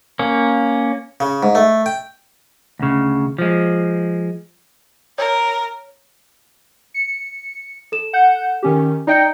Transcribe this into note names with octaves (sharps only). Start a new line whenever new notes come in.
A#3 C#4
C#3
G#2
A3
G5
D2 C#3
F3 G#3
A#4 C#5
C#7
A4 E7
F#5 G6
D#3 C#4 G4
D#4 D5 D#5 G5 G6 C#7